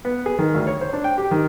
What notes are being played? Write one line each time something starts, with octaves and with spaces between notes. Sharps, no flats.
B3
G#4
D#3
D2
C#5
C5
D4
G5
G4
D#3